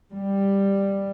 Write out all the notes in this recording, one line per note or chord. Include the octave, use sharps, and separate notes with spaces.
G3